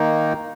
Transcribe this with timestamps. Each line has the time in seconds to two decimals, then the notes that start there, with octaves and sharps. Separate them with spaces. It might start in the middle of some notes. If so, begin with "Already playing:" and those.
Already playing: D#3 A#3 D#4